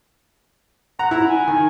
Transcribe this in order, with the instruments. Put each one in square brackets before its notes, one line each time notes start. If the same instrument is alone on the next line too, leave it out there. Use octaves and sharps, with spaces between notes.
[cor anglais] F#5 [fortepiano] A#5
[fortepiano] E4
[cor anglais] G#5
[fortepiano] D#3